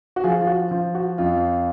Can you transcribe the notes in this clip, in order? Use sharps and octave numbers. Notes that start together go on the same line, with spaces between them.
F#4
F3 F4 G#4
F4
F#4
F3 F4
F#4
F2 F4